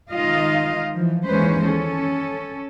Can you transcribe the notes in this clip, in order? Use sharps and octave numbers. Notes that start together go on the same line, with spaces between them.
D#3 G#3 D#4 F4 D#5 F5
E3 F3
D#2 E3 G#3 C#4 B4 C5
C#4 A4